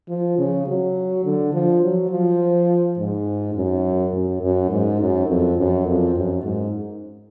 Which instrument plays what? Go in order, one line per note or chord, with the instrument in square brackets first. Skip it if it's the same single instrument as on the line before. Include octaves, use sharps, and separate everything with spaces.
[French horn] F3
C#3
F#3
D3
F3
F#3
F3
G#2
F#2
F#2
F#2
G#2
F#2
F2
F#2
F2
F#2
G#2